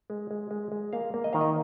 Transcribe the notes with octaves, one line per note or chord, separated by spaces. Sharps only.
G#3
G#3
G#3
G#3
A#3 F5
A#3
D#5
D#3 F5
D#5